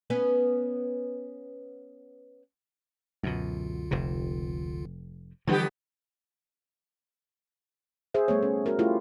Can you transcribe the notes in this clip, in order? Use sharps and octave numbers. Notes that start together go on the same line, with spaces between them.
B3 C#4 B4
C#2 F#2 B2 D3 F4
F1 C3
D3 E3 F3 G3 B3 G4
G#4 C5 E5
G3 A3 B3 C#5
C#4
F#4 A#4
A3 E4 F4 G4